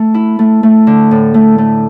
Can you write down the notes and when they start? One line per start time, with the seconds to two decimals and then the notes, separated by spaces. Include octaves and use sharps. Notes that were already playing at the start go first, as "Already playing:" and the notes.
Already playing: A3
0.14 E4
0.39 A3
0.63 A3
0.87 D3
1.11 A2
1.34 A3
1.58 A3